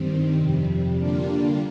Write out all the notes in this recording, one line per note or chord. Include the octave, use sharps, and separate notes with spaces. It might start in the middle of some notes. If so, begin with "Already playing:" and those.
Already playing: G2 D#3 G3 C4
F2 C3 G3
D3 G3 A#3 D4 F4